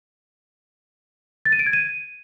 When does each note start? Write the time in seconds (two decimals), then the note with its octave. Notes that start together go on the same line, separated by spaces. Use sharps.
1.45 A6
1.52 D#7
1.59 D7
1.66 G#6
1.73 D#7